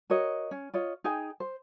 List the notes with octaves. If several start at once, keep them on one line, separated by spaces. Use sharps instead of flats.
F#4 A#4 C#5 D#5
C#4
F4 C#5 D#5
D#4 G#4 G5 G#5
C5